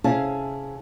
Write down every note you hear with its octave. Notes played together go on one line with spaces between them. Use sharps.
C3 C#4 E4 G#4 F5 A5